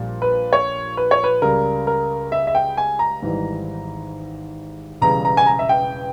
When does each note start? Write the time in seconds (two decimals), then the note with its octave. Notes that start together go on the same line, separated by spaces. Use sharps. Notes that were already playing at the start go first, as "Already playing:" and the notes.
Already playing: A#1 A#2 G3
0.22 B4
0.53 C#5
0.97 B4
1.11 C#5
1.24 B4
1.42 C#2 C#3 G3 A#4
1.87 A#4
2.32 E5
2.47 E5
2.55 G5
2.77 G#5
2.99 A#5
3.22 G#1 G#2 E3 G3
5.02 E1 E2 C#3 G3 A#5
5.25 A#5
5.37 G#5
5.46 A#5
5.59 E5
5.69 G5